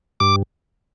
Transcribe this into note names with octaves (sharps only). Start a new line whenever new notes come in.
G2 D6